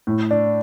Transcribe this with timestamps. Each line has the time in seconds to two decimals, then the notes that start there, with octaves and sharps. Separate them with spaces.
0.07 A2
0.31 D4